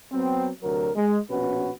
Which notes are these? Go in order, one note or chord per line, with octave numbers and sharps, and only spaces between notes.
F#3 B3 C4
D2 C3 F#3 A#4
G#3
A#1 B2 C#4 F#4 B4